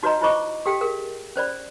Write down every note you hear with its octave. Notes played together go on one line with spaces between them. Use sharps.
D#4 F#4 B4 C#5 D#5 A#5
E4 F4 C5 D#5 C#6 D6
G4 A4 F5 G5
G#4 A#4 F5
C#4 C5 D5 B5